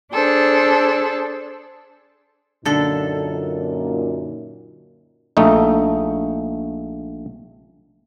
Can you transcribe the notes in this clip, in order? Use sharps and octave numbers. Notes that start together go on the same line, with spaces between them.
D4 G#4 A4 C5
F#2 A#2 D3 D#4 A4
A#1 A3 D#4